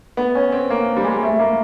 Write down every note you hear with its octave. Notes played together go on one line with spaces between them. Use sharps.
B3
C#4
C4
A#3
G3
G#3
A3
A#3